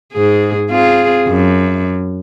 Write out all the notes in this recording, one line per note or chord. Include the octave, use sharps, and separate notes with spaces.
G#2 G#4
C4 F4 G#4
F#2